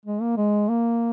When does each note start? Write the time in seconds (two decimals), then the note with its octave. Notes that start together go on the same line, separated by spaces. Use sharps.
0.05 G#3
0.22 A#3
0.37 G#3
0.69 A#3